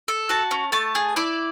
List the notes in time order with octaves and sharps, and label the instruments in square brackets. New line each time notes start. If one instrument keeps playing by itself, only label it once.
[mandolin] A4
F#4 A5
C#4
A3 A5
G#4
E4 D5